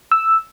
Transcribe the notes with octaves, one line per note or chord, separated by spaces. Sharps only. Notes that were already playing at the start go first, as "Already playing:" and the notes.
E6